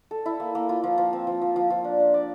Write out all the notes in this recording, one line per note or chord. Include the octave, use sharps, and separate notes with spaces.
A4
E4
A#3
A#3
F4
F3
F3
C4
F3
F3
F3
F3
D4
D4
D5